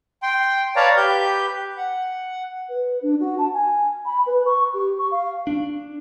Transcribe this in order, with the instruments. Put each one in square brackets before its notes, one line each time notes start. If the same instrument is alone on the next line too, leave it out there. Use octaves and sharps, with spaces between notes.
[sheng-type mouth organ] G5 C6
B4 C#5 D5 F5 A5 A#5
G4 B4 G6
F#5
[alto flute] B4
D4
F#4
A5
G#5
B5
B4
C#6
G4
C#6
F5
[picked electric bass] D4